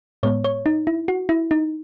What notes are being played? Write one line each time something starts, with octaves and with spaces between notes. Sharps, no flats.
A2 G#3 B3 C#5
C#5
D#4
E4
F#4
E4
D#4